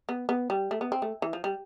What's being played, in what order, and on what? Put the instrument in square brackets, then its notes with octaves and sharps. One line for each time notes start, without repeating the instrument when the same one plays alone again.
[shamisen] B3
B3
G3
A3
B3
C4
A3
E3
F3
G3